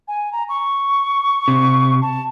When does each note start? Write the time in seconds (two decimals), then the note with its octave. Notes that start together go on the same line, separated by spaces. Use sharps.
0.08 G#5
0.32 A#5
0.49 C#6
1.48 C3
2.02 A5